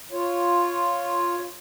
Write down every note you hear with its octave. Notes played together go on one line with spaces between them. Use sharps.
F4 C#5